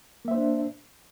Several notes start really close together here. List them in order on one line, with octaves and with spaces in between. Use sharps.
A#3 E5 C5 D4